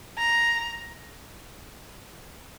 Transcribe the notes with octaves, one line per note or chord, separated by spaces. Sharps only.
A#5